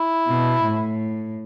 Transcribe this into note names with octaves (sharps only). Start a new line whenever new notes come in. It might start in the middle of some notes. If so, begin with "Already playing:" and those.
Already playing: E4
B2
A2